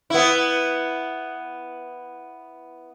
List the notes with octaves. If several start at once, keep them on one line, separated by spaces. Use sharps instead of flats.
B3 E4